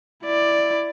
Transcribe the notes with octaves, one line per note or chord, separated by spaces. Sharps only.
E4 D5